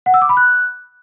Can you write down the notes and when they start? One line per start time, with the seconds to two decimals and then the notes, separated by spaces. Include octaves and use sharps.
0.06 F#5
0.14 E6
0.22 D6
0.29 B5
0.37 F#6